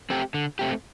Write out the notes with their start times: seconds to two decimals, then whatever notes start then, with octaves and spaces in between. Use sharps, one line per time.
0.10 A3 C4 G4
0.34 D3
0.59 A3 C4 G4